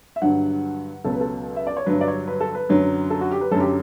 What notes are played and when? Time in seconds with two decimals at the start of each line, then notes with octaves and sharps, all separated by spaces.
0.16 E5
0.22 G2 D3 F#3 F#5
1.04 C#2 B2 F#3 A4
1.12 B4
1.21 A4
1.56 E5
1.67 D5
1.77 C#5
1.86 G2 D3 F#3 B4
2.01 D5
2.08 C#5
2.28 B4
2.40 A4
2.55 B4
2.69 F#2 D3 F#3
3.10 A4
3.21 F#4
3.31 G4
3.41 B4
3.51 F#2 D3 F#3 A4
3.60 G4